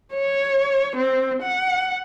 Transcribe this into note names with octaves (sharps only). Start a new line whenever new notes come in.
C#5
C4
F#5